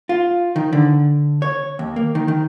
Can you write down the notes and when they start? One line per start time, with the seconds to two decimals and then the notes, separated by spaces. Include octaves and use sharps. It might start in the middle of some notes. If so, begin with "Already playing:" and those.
0.09 F4
0.56 D#3
0.73 D3
1.42 C#5
1.79 D#2
1.96 A#3
2.15 D#3
2.28 D#3